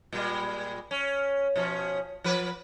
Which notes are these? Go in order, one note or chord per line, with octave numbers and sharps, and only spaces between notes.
A#2 G3 G#3
C#4
B2 F3 C#4
F3 B4